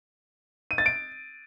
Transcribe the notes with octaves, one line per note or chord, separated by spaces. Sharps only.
D#7
A6
D7